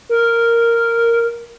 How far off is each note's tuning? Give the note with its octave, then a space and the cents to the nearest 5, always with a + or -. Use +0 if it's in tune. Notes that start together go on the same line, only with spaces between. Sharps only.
A#4 -5